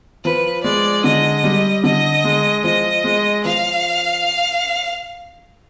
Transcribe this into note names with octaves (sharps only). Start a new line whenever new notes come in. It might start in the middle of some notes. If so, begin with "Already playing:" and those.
F3 B4
G#3 D5
D3 D#5
G3
D3 D#5
G#3
F3 D#5
G#3
F3 F5